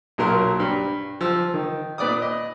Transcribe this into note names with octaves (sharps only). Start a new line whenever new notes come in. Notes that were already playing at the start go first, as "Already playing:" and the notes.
B1 A#2 F#3 A#4 C6
G2
F3 E6
D#3
A#2 B4 D5 D6 D#6
D#5